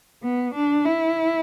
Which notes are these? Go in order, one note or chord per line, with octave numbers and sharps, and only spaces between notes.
B3
D4
E4